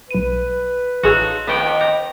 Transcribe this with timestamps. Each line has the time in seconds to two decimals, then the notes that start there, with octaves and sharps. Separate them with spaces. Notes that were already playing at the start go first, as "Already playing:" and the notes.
0.11 B1 B4 D#7
1.03 A1 A3 D#4 F4 F#4 G#4 C#5 E6
1.47 F2 D#3 A3 B3 G5
1.81 A#5 D6 G6 C#7